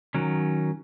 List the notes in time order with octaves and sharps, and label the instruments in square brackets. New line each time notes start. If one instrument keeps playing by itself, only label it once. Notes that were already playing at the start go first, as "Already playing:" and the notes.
[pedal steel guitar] D#3 F#3 C#4